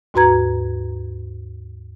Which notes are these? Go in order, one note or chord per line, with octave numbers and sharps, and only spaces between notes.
D#2 G#2 F#4 B4 A#5 G#6